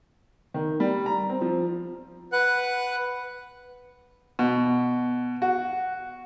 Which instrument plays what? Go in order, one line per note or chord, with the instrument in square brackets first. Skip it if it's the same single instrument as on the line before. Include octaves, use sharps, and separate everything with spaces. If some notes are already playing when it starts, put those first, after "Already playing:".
[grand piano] D#3
G3
A#5
C4
F3
[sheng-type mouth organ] B4 F#5 F#6
[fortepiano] B2
F#4